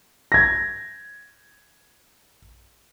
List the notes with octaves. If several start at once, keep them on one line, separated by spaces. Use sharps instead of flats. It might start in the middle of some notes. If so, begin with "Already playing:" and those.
G#6 A#6